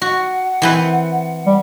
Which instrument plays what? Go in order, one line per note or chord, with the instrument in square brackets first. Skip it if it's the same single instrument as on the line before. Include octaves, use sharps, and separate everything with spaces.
[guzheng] F#4 [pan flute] F#5
[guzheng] E3 C4 B4
[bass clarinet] G3